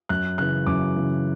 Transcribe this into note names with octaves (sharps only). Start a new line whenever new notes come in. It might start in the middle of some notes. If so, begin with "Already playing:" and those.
F#2 F#6
C#3 E3 F#6
F#2 D6
C#3 E3